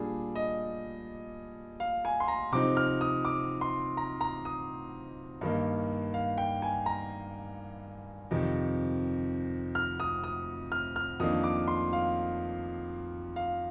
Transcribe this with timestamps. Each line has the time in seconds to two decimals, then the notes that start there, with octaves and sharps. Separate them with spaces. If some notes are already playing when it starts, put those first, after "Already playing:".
Already playing: A#2 G3 D4 G#4
0.36 D#5
1.80 F5
2.05 G#5
2.20 C6
2.28 A#5
2.52 C3 F3 C4 D#4 D6
2.77 F6
3.01 D#6
3.25 D6
3.61 C6
3.97 A#5
4.21 A#5
4.45 D#6
5.41 G2 D#3 A#3
6.14 F5
6.38 G5
6.62 G#5
6.86 A#5
8.31 F2 C3 D#3
9.75 F6
10.00 D#6
10.24 D#6
10.72 F6
10.96 F6
11.20 F2 D#3 A#3 D4 D#6
11.44 D6
11.68 C6
11.93 F5
13.36 F5